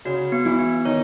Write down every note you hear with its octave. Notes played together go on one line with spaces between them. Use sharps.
C#3 C#4 F#4
B3
E3 E4
B3
D#3 D#4 C#5